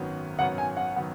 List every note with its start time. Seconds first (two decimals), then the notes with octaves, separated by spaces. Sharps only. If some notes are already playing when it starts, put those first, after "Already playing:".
Already playing: G#1 F#2 D#3 F#3 B3
0.39 G#1 F#2 D#3 F#3 B3 F#5
0.58 G#5
0.77 F#5
0.96 D#3 F#3 B3